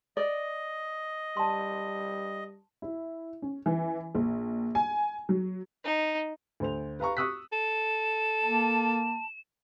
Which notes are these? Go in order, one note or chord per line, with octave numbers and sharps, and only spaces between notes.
D5 D#5
G3 A5 C6
E4
C#4
E3
A#1
G#5
F#3
D#4
D2 C5 F7
B4 F5 A#5 C#6
C#6 D#6 E6 F#6 B6
A4 E7
A#3 A5